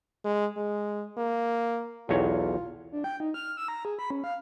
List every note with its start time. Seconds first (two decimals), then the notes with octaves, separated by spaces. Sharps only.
0.25 G#3
0.57 G#3
1.18 A#3
2.09 B1 E2 F4 C#5
2.92 D4
3.04 G5
3.20 D#4
3.34 F6
3.57 E6
3.68 A#5
3.85 G#4
3.99 B5
4.11 C#4
4.24 F5